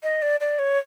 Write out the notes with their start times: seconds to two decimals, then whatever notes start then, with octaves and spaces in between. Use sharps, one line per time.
0.03 D#5
0.22 D5
0.40 D5
0.59 C#5